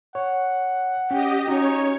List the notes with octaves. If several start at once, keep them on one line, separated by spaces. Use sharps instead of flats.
C#5 F#5
C#4 G4 D#5 G5
C#4 D#4 F#4 C#5